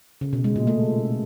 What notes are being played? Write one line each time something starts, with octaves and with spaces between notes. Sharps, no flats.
C#3
B2
G#3
A#2
A3